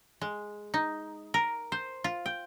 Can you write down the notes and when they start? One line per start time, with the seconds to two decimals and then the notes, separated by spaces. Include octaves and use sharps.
0.21 G#3
0.74 D#4
1.34 A#4
1.72 C5
2.04 F4
2.26 G5